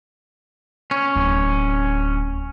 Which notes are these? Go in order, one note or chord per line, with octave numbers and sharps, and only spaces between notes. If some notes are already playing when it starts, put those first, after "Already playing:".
C#4
D1